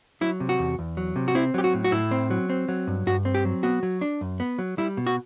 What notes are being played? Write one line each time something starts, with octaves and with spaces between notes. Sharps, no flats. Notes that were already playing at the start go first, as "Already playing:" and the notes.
F#3 E4
C3
F#4
E2
E2
F#3
C3
F#4
C4 E4
F#3 G4
F#4
A2
F#4
A2 E4
C4
F#3
C4
F#3
G2
G2 F#4
C4
G4
F#3
B3 F#4
F#3
D4
F#2
B3
F#3
G3 E4
B2
F#4